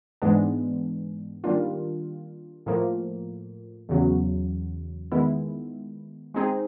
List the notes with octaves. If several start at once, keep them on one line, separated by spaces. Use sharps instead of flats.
G#2 E3 G#3 B3 D4
D#3 G3 A#3 D4 F4
A2 F3 A#3
E2 C#3 F#3
D#3 G#3 B3 E4
G#3 C4 D#4 G#4